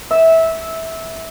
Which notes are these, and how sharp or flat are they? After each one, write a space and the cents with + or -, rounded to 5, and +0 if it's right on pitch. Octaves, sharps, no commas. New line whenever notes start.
E5 -15